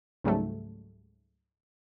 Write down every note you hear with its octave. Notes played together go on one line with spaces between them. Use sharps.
C#2 G#2 F#3 G3 A3